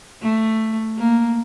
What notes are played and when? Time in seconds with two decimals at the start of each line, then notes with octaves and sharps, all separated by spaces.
0.22 A3
0.98 A#3